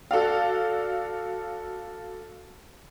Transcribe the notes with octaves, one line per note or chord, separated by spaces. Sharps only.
F#4 A4 D5 F5